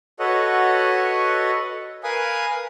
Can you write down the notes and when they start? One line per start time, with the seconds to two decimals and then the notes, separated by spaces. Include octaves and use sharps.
0.19 F#4 A4 B4 C#5 D#5 F#5
2.03 A#4 B4 F5 G#5 D#6